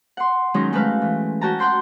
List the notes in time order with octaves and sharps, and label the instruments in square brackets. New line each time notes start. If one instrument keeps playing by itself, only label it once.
[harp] F#5 C6
D#3 F#3 G#3 C#4 D#4
G#3 A3 D#4 B4 F5
E3
C#4 F#4 G5 A5 A#5
F#5 G5 C6 G6